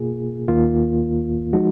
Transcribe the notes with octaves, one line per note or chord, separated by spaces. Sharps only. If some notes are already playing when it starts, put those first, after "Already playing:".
Already playing: B2 A#3 F4 G#4
D#2 D#3 A#3 F4
F3 G#3 D#4 F#4